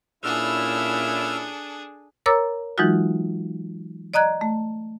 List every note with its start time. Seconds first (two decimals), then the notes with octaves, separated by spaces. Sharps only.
0.24 A#2 C#4 D4 E4 G#4 A4 E6 F6
2.26 A#4 C#5 A#5 D6 E6 A6
2.78 E3 F#3 G#3 D#4 F4 F#4
4.14 D5 D#5 A#5 F#6 G#6
4.41 A3